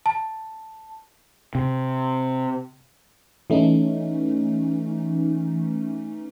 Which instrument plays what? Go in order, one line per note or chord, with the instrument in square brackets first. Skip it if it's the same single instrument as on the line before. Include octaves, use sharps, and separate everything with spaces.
[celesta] A5
[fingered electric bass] C3
[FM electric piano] E3 A3 C#4 D#4